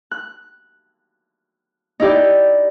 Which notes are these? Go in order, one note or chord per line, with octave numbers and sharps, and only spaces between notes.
F#6
D#4 E4 G4 D5